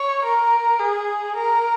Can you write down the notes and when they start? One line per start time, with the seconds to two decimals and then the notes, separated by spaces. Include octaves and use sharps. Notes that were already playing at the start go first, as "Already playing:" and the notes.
Already playing: C#5
0.24 A#4
0.79 G#4
1.36 A#4